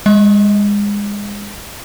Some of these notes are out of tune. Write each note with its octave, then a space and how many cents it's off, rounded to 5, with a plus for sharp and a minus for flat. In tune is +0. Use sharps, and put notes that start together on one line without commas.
G#3 -25 D#5 +30